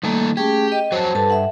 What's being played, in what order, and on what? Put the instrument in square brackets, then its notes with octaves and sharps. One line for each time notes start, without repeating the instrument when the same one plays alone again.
[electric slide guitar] D#3 A3 A4 [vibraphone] G3 A#3
[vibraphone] A3 C#4 G#4 [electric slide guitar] G4
[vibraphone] D#5 G5
[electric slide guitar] F2 F#4 C#5 [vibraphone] C5 A5
[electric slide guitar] G2 [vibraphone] A4 B4 A5
[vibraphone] E5 F#5